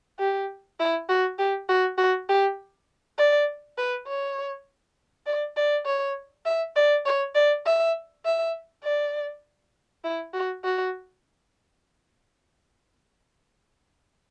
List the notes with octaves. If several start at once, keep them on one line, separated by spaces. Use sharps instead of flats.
G4
E4
F#4
G4
F#4
F#4
G4
D5
B4
C#5
D5
D5
C#5
E5
D5
C#5
D5
E5
E5
D5
E4
F#4
F#4